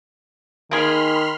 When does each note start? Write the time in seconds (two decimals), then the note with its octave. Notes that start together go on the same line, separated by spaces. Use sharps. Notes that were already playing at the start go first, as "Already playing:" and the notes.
0.71 D#3 A#3 G#4 B5 C6 F6